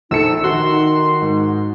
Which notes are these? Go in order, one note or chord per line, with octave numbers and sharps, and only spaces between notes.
A#1 D#4 A4 E6 C#7
D#3 F#4 C6
G#2